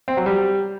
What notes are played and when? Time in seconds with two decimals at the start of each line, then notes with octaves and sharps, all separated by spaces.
0.08 C4
0.17 F#3
0.26 G3